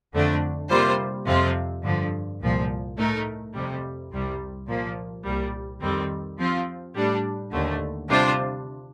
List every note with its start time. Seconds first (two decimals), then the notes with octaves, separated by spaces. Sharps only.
0.13 F2 D3 A3 D4
0.70 C3 G3 A#3 F4 C5
1.26 F2 C3 F3 C4 F4
1.83 G2 D3 F3
2.41 C2 A#2 F3
2.97 A2 A3 D#4 A#4
3.53 F2 C3 G3
4.11 C2 C3 G3
4.67 A#2 F3 A#3
5.25 C2 A#2 G3
5.81 F2 D#3 G3 C4
6.38 F3 C4 F4
6.95 A2 G3 D4
7.52 D#2 D3 A3
8.08 C3 G3 D4 F4 C5